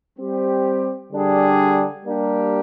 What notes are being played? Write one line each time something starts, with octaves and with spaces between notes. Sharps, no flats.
G3 C4 G4
D3 G3 D4 G#4
G3 A#3 D4 G4